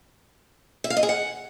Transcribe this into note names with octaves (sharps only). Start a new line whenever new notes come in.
E5
F5
D#5
G#4
F#5